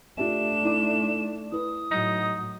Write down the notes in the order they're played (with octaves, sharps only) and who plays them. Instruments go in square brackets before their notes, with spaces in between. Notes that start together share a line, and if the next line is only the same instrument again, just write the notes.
[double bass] A3 D4 [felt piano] F4 G4 E5 [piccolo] E7
[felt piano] D#4 E4 D6
[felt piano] E4 B4 [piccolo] D#6
[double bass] A2 F#3 [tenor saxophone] D#4